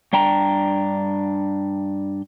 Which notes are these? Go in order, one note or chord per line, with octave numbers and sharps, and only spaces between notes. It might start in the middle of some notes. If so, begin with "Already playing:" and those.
G2 D4 G5 A#5